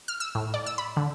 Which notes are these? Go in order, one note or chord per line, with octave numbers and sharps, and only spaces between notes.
F6
E6
A2
D5
E6
B5
D3